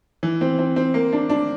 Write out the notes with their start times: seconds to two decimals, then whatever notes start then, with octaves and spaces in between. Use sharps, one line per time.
0.23 E3
0.41 C4
0.59 C4
0.76 C4
0.94 A#3
1.13 D4
1.30 D4